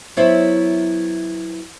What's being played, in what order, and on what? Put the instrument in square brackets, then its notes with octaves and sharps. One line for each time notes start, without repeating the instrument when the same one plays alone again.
[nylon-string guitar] F#3 B3 E4 C5 C#5 E5